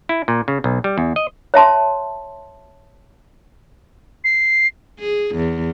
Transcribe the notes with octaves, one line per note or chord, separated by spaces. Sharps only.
E4
A#2
C#3
B1
G3
E2
D#5
C#5 E5 A5 C6
C7
G#4
E2